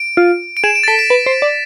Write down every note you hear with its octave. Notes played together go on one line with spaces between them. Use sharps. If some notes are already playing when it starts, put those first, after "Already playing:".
Already playing: D7
F4
D7
G#4 E7
D7
A6
A4 B6
D7
B4
C5
D5